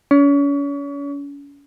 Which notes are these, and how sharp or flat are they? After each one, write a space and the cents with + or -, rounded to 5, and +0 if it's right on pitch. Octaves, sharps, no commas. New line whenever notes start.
C#4 +35